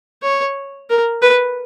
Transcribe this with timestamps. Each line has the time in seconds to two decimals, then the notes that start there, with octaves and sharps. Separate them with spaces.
0.23 C#5
0.90 A#4
1.22 B4